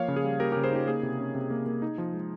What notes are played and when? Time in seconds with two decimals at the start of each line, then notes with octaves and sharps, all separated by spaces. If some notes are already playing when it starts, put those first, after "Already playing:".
Already playing: F3 A#3 C#5 F5
0.08 C#3
0.16 G#4
0.24 G3
0.40 A#3 G4 A#4
0.52 C#3 G4 A#4
0.64 G#4 C5
0.71 D#4 G4
0.88 A#3 G#4
1.03 C3
1.19 C#4
1.35 C3
1.51 A#3
1.66 A#3
1.82 D#4
1.98 F3
2.14 G#3